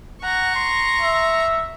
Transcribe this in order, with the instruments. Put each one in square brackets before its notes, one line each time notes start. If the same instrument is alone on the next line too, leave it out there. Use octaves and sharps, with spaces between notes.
[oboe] F#5 [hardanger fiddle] A#5 C#6
[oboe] C6
[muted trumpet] E5